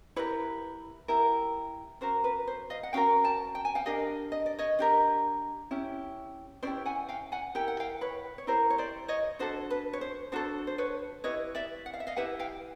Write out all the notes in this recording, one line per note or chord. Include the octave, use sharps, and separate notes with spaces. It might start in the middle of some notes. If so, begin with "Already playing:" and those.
E4 G4 A#4 B4 C#5
E4 G4 A#4
C#4 F#4 A#4 C5
B4
C5
D#5 F5
F#5
C#4 F#4 A#4 F5 G5
G5 A5
G5
G#5
F5 G5
D4 G4 A#4 D#5 F5
D#5
D5
C#5 D#5
D4 G4 A#4
C#4 E4 G4
C#4 E4 G4 C5 D5
F#5 G#5
F5 G5
F#5 G#5
E4 G4 A#4 G5
F#5
F5 G5
B4 C#5
C#5
E4 G4 A#4 C5
C#5
C5 D5
C#5 D#5
D4 F#4 A4 C5
B4
C#5
C5
D4 F#4 A4 C5
C5
B4 C#5
E4 G4 B4 C#5 D#5
D5 E5
F#5
F5
E5
D#5 F5
E4 G4 B4 E5 F#5
F5 G5